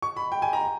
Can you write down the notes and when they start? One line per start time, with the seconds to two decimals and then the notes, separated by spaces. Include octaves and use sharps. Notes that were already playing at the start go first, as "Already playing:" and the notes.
0.02 C#6
0.17 B5
0.32 G5
0.42 G#5
0.53 A#5